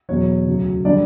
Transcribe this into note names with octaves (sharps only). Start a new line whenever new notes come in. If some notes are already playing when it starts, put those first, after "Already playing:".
E2 B2 F#3 C#5
D2 C#3 F#3
D3 G3 D4 D5